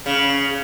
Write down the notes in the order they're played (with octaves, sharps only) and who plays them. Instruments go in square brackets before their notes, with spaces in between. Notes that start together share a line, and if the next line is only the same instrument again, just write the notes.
[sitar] C#3